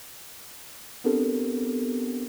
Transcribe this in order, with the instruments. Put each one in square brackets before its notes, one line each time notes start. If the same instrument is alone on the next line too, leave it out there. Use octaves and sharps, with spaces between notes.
[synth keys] B3 C4 D4 G4 A4 A#4